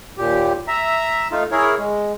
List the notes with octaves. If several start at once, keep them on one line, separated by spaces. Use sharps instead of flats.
D#2 A#2 G4
E5 A#5
A3 D#4 F4
E4 G#4 A#4 C#5
G#3